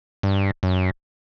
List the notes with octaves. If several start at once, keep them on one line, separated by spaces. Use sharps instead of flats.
G2
F#2